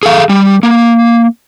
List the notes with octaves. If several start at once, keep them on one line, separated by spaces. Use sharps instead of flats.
G#4 A4 F5
G3
A#3